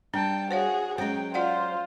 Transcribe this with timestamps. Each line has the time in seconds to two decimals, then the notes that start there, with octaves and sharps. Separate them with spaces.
0.14 G3 D4 G5 A5
0.51 F#4 G#4 C5 C#5 F5
0.98 F#3 G#3 C#4 C5 G5
1.34 F4 C5 D5 F5 F#5